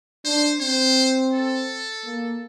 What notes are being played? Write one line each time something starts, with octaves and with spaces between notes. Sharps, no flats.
D4 C5
C4 C5
A4
A#3